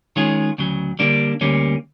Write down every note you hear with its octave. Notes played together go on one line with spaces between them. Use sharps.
D#3 G#3 C#4 F4 G#4
D2 C#3 F#3
D3 G3 A#3 D4
D2 D3 G3 A#3 C#4